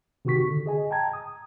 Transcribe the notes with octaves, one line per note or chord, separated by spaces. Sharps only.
C3 D#3 F#4 G4 C#6 B6
D3
G#4 D#5 G#5
G5 A5 A#5 G#6
D#6